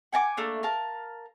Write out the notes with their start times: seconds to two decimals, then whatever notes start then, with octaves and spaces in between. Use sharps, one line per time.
0.13 F#5 G#5 A5 D6
0.37 A3 A#3 D4
0.63 A#4 F5 A5